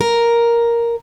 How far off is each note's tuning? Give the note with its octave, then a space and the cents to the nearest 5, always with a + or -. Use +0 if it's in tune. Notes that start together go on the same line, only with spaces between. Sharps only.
A#4 +5